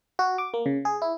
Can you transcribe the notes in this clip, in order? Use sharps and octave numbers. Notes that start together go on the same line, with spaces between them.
F#4
D6
A#3
C#3
G#4
E4